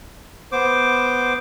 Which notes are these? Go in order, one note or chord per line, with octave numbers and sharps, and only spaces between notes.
B3 C5 D6